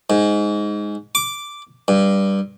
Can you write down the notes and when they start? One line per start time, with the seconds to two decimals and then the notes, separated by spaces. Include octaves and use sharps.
0.10 G#2
1.15 D6
1.88 G2